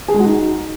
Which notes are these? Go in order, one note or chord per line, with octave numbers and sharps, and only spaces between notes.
G#4
G#3
F#4
D#4